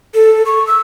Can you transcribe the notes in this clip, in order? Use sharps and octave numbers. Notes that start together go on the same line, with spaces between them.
A4
C#6
E6